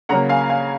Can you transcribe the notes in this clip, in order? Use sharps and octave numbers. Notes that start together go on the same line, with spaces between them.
C#3 F#3 A#3 F#5 A#5
F5 G#5
F5 G#5